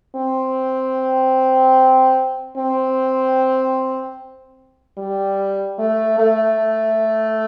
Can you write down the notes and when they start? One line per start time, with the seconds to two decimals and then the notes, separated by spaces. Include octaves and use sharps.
0.16 C4
2.57 C4
4.98 G3
5.79 A3
6.19 A3